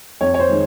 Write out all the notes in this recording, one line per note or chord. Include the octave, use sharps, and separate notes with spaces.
F2 C#5
C#5
C5
D#3 G#3